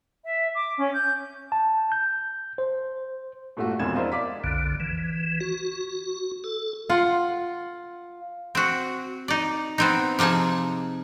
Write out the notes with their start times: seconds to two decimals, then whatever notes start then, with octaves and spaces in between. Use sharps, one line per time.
0.24 E5
0.54 D6
0.76 C#4
0.93 G6
1.52 A5
1.92 G6
2.58 C5
3.57 G2 A#2 A3 E4 F#4
3.79 E1 F2 G#3 F4 G#6 E7
3.95 D4 E4 A#4 C5 D#5 F5
4.12 D5 F5 D6 B6
4.44 B1 F2 D3
4.80 E3
5.41 F#4
6.44 A4
6.89 F4 F#5 C6
8.55 C4 F#4
9.28 D#4 D5
9.78 B3 C4 D#4
10.19 C3 F3 D#4 G#4 A5